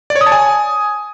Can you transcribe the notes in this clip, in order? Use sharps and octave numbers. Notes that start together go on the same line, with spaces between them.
D5
C#5
D#6
A5
G#5